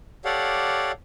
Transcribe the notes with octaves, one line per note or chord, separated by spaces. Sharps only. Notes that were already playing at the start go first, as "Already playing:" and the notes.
G4 A4 C#5 D5 F5 F#5